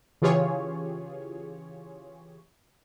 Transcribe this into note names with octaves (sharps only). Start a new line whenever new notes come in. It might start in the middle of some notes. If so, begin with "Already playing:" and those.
C#3 E3 F4 G4 G#4 C#5